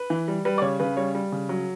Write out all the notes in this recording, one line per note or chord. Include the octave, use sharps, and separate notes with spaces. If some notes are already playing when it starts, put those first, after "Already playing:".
Already playing: B4
E3
G3
G3 B4
D5
C#3 C#5
C#3 B4
G3 C#5
G3
C#3
F#3